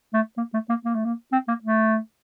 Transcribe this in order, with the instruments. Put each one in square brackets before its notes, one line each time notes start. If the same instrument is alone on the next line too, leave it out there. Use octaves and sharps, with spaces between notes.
[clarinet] A3
A#3
A3
A#3
A#3
A3
A#3
C4
A#3
A3